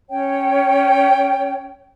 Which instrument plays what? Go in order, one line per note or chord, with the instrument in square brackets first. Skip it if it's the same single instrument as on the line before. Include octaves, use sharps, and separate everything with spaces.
[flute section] C#4 C#5 G5